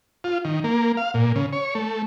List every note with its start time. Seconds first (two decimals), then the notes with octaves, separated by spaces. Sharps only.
0.24 F4
0.45 D#3
0.64 A#3
0.97 F5
1.14 A#2
1.36 C#3
1.53 C#5
1.75 A3